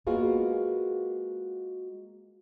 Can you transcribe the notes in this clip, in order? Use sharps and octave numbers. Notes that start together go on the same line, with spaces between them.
G#3 A#3 B3 F4 F#4 G#4